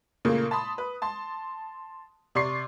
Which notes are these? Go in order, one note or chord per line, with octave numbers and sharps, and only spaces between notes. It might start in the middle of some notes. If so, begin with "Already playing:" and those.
A#2 C#3 A3 A#3
A5 B5 C6 D#6
B4
A5 C6
C3 D5 C6 C#6 C7